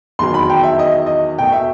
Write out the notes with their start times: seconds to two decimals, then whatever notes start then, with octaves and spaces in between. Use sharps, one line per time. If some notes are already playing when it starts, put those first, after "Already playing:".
0.19 E2 D#3 F#3 C6
0.34 B5
0.50 G5
0.63 E5
0.79 D#5
1.06 D#5
1.38 B2 A3 G5
1.52 E5